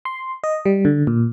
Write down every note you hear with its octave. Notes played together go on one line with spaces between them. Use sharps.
C6
D#5
G3
D3
A#2